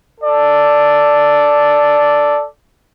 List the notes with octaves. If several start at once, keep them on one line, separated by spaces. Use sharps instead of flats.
A4 D5